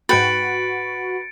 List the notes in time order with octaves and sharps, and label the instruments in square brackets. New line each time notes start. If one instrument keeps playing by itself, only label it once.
[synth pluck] G#2 G5 [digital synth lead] F#4 [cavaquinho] B4 [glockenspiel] A6 C#7 D7